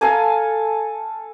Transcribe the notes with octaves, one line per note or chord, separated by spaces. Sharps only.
A4 F5 G#5 A#5